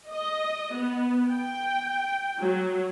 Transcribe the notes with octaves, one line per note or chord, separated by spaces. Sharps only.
D#5
B3
G5
F#3